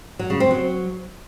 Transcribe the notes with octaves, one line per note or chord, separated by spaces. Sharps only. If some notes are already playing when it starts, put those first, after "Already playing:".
F#3
C#3
C4
F#3